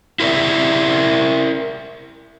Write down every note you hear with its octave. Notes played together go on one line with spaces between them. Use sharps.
E4 F4 A#4 C5 D5 E5